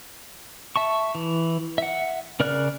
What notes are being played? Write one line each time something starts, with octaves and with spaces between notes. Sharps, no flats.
E5 A5 C#6
E3
E5 F#5
C#3 A#4 D5 F6 F#6